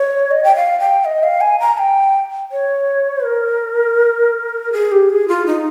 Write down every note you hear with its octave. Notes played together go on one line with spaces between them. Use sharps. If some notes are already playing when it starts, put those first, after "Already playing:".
Already playing: C#5
D#5
G5
F5
G5
D#5
F5
G#5
A#5
G5
C#5
A#4
G#4
G4
G#4
F4
D#4